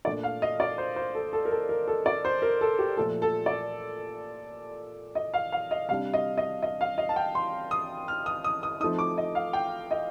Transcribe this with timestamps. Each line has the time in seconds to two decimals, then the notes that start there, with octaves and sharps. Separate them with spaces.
0.05 A#2 A3 D4 D5
0.23 F5
0.42 D#5
0.60 D5
0.78 C5
0.96 C5
1.15 A4
1.33 A4
1.45 A#4
1.51 A4
1.69 A#4
1.88 A4
2.06 D5
2.25 C5
2.42 A#4
2.61 A4
2.79 G4
2.96 A#2 F3 A3 A4
3.22 A4
3.46 D5
5.15 D#5
5.34 F5
5.52 F5
5.71 D#5
5.88 C3 G3 D4 F5
6.14 D#5
6.38 D#5
6.62 D#5
6.81 F5
6.98 D#5
7.09 A5
7.16 G5
7.35 C6
7.71 D#6
8.08 F6
8.26 D#6
8.44 D#6
8.63 D#6
8.80 F3 A3 C4 D#4 D#6
8.98 D6
9.18 D#5
9.35 F5
9.53 G5
9.91 D#5